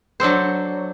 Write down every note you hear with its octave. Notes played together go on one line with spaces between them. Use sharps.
F#3 D4 A4 C5